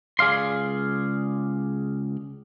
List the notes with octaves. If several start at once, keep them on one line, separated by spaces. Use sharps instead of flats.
C#2 G#4 D5 F5 C6